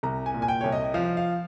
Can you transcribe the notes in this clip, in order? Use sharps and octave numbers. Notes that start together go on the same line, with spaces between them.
C2 A#5
G#5
A#2
G#5
G5
C2 C#5
D#5
F3 F5
F5